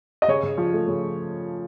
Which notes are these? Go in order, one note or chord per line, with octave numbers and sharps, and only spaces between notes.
D#5
C#3 C#5
C#3
F3
A3
C#3